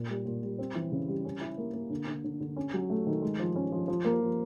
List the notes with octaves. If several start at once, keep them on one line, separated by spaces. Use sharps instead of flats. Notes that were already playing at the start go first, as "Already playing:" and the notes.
Already playing: A#2
G3
A#2
G3
C4
E3
C#3
G3
C#4
E4
A#3
A#3
D3
D3
D3
D3
C#4
F#3
A3
D#3
G#3
F3
C#4
F3
F3
A#3
F3